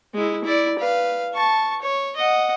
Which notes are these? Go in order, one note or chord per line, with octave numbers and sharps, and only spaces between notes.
G#3 E4
E4 D5
B4 F5
A5 C#6
C#5
D#5 F#5